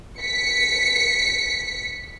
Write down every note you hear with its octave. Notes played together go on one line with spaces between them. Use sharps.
B6 C#7